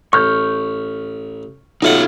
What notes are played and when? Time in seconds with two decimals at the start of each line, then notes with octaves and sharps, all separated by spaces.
0.13 A1 C#6 F6 G6
1.82 B1 A3 D#4 F4 F#5